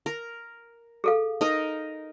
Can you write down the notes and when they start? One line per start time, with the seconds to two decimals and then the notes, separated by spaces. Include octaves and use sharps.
0.06 A#4
1.04 G#4 A4 F5
1.41 D#4 A#4 D#5